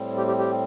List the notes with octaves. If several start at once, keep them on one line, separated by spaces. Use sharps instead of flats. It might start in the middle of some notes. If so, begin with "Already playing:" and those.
Already playing: A2 G3 C4
G4
G4
G4